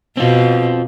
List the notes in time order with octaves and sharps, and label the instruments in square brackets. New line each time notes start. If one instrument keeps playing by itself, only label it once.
[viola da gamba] B2 [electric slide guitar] C4 F4